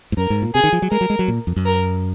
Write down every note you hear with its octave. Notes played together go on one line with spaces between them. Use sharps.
G#2
F#2 A#4
G#2
A#2
C3 G#4
D#3
F3
F#3
G#3 A#4
F#3
G#3
F#3
A#2
F2
F#2
A#4